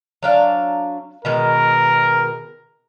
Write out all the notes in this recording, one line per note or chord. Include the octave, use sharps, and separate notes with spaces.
F#3 D4 F5
B2 D#3 G#3 A#4